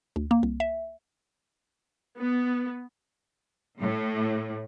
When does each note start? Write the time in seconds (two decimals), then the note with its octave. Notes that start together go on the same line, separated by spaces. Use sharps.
0.16 D2
0.31 A#3
0.43 C2
0.60 E5
2.20 B3
3.80 A2